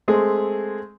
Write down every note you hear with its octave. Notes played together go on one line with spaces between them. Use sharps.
G#3 A3 C4 G#4